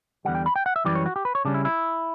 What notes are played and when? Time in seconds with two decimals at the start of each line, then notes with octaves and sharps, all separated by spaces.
0.25 E2 D3 G3 F#5
0.35 G5
0.46 B5
0.56 G5
0.66 F#5
0.76 E5
0.85 F#2 E3 G3 D5
0.95 C#5
1.06 F#4
1.16 G4
1.25 B4
1.35 C#5
1.45 C#3 G3 C#4 D4
1.54 E4
1.65 E4